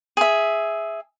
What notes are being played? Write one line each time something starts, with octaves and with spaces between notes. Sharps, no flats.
G#4 E5